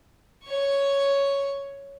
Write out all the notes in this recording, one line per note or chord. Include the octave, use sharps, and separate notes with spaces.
C#5 C#6